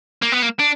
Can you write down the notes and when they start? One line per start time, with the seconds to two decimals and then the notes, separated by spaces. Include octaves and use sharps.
0.22 A#3
0.32 B3
0.42 A#3
0.59 D4